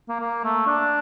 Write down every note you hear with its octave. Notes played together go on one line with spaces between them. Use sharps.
A#3
A#3
A3
D4